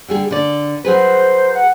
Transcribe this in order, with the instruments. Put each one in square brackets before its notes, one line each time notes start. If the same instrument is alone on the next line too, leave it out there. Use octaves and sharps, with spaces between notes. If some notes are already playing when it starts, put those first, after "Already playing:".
[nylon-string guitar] D3 G3 G#4
D3 D5
[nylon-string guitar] F#3 G#4 B4 [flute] C5
[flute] F#5